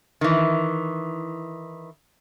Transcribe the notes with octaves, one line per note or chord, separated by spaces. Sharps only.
D#3 E3